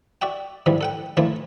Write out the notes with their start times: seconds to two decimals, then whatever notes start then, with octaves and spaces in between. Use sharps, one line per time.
0.22 F#4 D5 E5 G5
0.66 G#2 D3 E3 F3 G3
0.81 A4 F#5 G5
1.17 D2 A#2 E3 F3 A3 A5